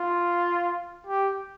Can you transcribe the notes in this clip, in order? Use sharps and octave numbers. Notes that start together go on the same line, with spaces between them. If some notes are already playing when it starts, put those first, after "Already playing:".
Already playing: F4
G4